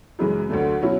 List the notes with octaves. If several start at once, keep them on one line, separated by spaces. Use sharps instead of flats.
F#2 C#3 E3 G#3
D2 D3 F#3 A3
B2 F#3 C#4 E4